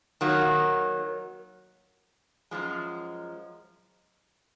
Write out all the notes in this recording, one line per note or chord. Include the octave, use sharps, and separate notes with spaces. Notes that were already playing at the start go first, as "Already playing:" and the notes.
D#3 F#3 A#3
F#2 F3 G#3